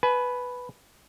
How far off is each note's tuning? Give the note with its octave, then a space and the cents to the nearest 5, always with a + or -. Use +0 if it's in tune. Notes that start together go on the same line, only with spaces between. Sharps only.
B4 +0 G#5 +40